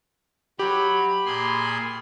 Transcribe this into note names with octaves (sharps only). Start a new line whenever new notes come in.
F#3 G4 B5
A#2 G#4 C6